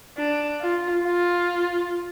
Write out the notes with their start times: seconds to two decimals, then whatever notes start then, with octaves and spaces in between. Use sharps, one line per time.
0.17 D4
0.61 F4
1.04 F4